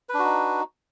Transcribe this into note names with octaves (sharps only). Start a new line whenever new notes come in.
D4 D#4 F#4 B4